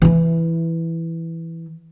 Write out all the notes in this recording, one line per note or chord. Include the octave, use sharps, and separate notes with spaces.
E3 E4